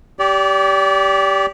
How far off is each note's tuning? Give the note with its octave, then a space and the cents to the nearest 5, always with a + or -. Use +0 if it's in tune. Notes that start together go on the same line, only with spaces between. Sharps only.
G4 +0 D5 -30